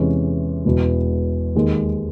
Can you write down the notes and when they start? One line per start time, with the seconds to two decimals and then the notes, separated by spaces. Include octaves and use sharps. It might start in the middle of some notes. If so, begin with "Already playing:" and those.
Already playing: E2 C3 E3 G#3 C#4
0.65 E1 E2 B2
1.55 D#2 D#3 G#3